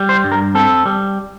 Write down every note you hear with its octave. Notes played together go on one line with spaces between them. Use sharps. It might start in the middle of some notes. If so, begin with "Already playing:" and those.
Already playing: G3
C5
G2
A#4
C4 A4
G3